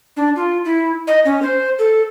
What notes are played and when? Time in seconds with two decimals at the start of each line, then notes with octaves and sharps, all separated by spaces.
0.17 D4
0.36 F4
0.65 E4
1.07 D#5
1.25 C#4
1.42 C5
1.79 A4